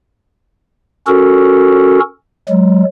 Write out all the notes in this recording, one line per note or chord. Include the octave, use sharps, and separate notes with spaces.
C#4 F#4 A4 A#4
F#3 G#3